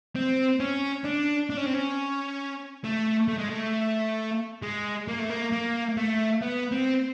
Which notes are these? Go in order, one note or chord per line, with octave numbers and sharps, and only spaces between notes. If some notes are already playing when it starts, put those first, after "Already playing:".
C4
C#4
D4
D4
C#4
C4
C#4
A3
A3
G#3
A3
G#3
A#3
A3
A#3
A#3
A3
B3
C4